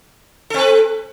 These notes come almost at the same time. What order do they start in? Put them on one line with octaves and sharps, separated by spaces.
A4 C4 B4